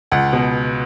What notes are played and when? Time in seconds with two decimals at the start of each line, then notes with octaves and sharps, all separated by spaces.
0.12 C#2 F#5
0.33 B2